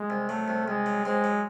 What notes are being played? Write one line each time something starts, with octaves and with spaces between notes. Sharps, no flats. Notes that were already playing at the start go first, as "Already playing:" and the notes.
Already playing: G#3
C2
F#3 A3
C2
C2 G#3
F#3
G#3 C4
F#3